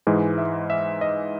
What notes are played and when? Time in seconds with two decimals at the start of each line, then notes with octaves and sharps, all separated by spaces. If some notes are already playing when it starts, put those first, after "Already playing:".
0.07 G#2 E3 G#3 G#4
0.38 E5
0.70 E5
1.01 D#5